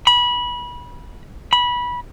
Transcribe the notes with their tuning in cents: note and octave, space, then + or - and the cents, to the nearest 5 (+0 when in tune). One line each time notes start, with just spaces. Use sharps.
B5 -25
B5 -20